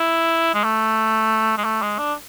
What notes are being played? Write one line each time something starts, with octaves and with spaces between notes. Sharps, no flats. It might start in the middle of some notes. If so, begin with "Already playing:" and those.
Already playing: E4
G#3
A3
G#3
A3
G#3
D4